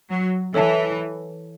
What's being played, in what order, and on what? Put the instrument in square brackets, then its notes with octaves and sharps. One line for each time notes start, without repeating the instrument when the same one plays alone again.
[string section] F#3
[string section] E3 [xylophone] A4 C#5 E5 A5